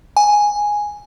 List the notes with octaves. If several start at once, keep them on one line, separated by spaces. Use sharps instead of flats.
G#5